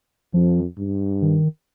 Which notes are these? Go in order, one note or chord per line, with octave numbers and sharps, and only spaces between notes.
F2 F3
G2
D#3